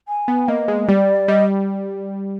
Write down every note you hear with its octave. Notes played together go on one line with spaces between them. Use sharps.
G#5
B3
A#3 D#5
G#3
G3 D5
G3 D#5